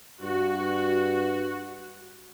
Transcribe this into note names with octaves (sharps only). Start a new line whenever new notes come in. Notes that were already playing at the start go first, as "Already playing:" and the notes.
G2 F#4